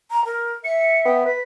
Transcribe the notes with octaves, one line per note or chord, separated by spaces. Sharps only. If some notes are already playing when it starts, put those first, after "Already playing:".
A#5
A#4
E5 C#7
B3 G5
B4 B6